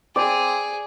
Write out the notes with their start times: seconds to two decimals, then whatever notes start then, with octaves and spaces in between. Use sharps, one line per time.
0.16 C4 G#4 D5